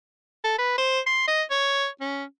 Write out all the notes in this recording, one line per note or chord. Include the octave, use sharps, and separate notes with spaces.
A4
B4
C5
C6
D#5
C#5
C#4